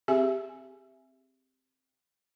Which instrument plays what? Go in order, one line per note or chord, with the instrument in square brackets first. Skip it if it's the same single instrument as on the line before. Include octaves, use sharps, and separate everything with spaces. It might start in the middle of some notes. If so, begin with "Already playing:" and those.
[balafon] C4 G4 G#4 E5 G#5